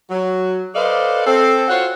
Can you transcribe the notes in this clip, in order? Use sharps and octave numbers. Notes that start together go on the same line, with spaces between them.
F#3
A4 B4 C5 D5 D#5 F5
C4 A4
F4 F#4 C5 C#5 F#5